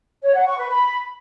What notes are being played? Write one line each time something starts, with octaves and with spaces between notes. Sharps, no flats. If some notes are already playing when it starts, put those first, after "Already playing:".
C#5
F#5
C#6
B4
B5